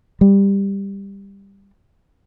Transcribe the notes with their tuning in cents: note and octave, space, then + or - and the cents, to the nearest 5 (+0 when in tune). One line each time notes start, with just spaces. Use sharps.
G3 +15